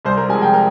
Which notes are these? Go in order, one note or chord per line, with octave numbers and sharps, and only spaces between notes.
C2 C5
A#4
C3 F3 G#3 G#5
G5
A#4